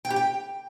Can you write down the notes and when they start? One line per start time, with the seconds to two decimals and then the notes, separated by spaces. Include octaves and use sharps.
0.05 G5
0.10 G4
0.16 G5